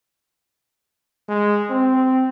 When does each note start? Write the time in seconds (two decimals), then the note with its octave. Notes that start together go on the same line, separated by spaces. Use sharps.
1.29 G#3
1.70 C4